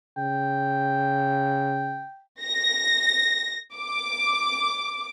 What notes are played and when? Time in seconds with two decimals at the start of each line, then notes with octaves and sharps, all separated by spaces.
0.17 C#3 G5
2.42 A#6
3.76 D6